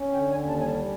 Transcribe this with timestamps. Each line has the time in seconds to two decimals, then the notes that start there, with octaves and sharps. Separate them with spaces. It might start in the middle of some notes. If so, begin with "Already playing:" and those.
Already playing: C#4
0.12 D3 G5
0.30 G#5
0.36 D#2
0.48 A5
0.59 G3 G#5
0.65 A5